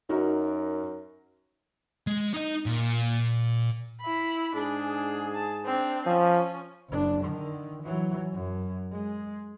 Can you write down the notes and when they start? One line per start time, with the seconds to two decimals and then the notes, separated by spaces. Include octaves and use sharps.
0.09 F#2 D#4 F#4 A#4
2.07 G#3
2.34 D#4 D#5
2.66 A#2
4.01 E4 B5
4.55 G#2 D4 G#4
5.35 A5
5.65 C4 D4
6.06 F3 C#4
6.89 F#1 D4
7.22 D3 D#3
7.83 E3 F#3
8.32 F#2
8.92 G#3